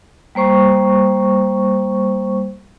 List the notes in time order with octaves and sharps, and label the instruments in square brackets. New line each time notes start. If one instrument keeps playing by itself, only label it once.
[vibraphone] G3 A#3 C5 C#6